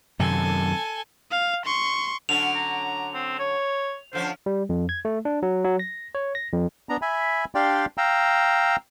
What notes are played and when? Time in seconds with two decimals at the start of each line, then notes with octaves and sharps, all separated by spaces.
0.19 F#2 C3 D#3 A4 G#5
1.31 F5
1.65 C6 C#6
2.29 D3 F#3 C#4 F7
2.55 A#5
3.14 C4
3.39 C#5
4.13 D3 F3 C#4 C5
4.46 G3
4.69 F2
4.89 G#6
5.05 A3
5.25 D4
5.43 F#3
5.65 F#3
5.79 A#6
6.15 C#5
6.35 A#6
6.52 F2
6.89 B3 D4 A#5
7.02 E5 G#5 B5
7.55 D4 G4 D5 F5 G5 C6
7.98 F5 G5 A#5 E6